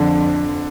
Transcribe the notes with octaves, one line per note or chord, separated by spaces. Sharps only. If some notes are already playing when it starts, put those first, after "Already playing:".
Already playing: F2 D3 F3 D4